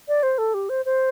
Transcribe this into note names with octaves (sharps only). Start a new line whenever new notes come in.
D5
C5
A4
G4
C5
C5